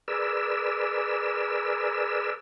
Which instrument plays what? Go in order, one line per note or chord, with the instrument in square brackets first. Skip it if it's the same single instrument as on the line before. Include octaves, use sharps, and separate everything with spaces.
[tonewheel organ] G#4 A#4 B4 D5 E6